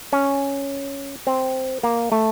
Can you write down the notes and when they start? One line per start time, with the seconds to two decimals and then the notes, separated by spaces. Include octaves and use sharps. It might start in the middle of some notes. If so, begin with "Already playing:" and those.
0.13 C#4
1.27 C4
1.83 A#3
2.12 A3